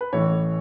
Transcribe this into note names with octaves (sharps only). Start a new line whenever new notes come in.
B4
A1 A2 E3 A3 C#5